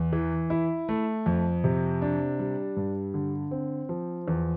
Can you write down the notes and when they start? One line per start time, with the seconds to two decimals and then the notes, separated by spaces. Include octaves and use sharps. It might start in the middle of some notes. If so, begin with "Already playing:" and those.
Already playing: E2
0.12 E3
0.50 E4
0.89 A3
1.26 F2
1.64 C3
2.02 D4
2.39 G3
2.77 G2
3.14 D3
3.51 C4
3.89 F3
4.28 E2